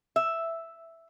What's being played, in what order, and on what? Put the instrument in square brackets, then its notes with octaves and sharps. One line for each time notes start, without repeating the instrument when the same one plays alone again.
[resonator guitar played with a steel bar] E5